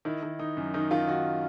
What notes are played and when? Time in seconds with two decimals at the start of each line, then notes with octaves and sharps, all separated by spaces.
0.05 D#3 E4
0.23 D#3
0.39 D#3 D#4
0.57 F#2
0.74 D#3 D#4
0.91 D#3 F4
1.08 D#3 F#4